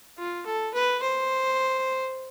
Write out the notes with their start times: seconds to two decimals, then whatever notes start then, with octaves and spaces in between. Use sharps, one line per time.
0.18 F4
0.46 A4
0.74 B4
1.02 C5